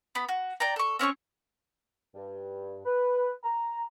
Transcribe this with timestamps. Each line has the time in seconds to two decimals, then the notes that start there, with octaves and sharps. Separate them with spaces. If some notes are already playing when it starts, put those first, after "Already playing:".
0.15 B3 B5
0.29 F#4
0.60 D5 G5 A#5
0.76 A4 C#6
0.99 C4 C#4 C#5 C#6
2.15 G2
2.85 B4
3.43 A#5